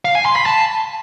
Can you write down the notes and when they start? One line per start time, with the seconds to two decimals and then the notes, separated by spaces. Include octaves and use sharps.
0.05 F5
0.15 G#5
0.26 C6
0.36 B5
0.46 A5